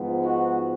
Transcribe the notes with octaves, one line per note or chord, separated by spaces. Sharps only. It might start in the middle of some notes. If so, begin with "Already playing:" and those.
Already playing: G#2 F3 B3
D#4 F#4